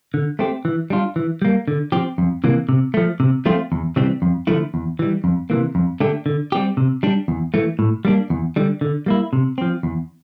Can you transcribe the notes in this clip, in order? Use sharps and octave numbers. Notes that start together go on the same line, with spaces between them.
D3
A3 C4 G4
E3
G3 D4 F4
E3
G3 A#3
D3
F3 C4 G4
F2
C3 E3 A#3
C3
F3 A3
C3
F3 A3 C4 F4
E2
C3 E3 G3 C4
F2
D3 F3 A3 E4
E2
E3 G3
F2
C3 E3 A#3
F2
D3 A3 D4 G4
D3
G3 C4 G4
C3
G3 D4
E2
E3 A3
A2
G3 A#3 D4
E2
D3 G3
D3
G3 A#3 E4
C3
F3 C4
E2